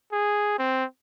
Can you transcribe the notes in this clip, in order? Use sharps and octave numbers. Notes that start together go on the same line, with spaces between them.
G#4
C4